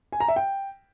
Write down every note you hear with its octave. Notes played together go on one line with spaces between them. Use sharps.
G#5
A#5
E5
G5